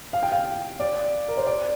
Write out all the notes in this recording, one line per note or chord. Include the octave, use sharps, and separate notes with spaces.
F5
G5
F5
D5
A#4
C5
D5